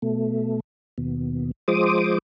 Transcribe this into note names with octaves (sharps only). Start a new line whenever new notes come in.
B2 A3
D#2 B2
F3 G#3 C5 D6 D#6